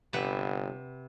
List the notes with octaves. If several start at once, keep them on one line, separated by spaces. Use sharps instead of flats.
G1 C3 B4 F#5